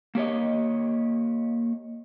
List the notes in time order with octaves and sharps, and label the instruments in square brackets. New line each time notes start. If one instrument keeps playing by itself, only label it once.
[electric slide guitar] A#3 G4 C#5 D#5